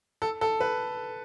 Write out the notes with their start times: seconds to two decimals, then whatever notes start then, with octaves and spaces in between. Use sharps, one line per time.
0.22 A4
0.41 A4
0.60 B4